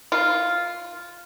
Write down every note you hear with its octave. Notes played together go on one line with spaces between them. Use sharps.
F4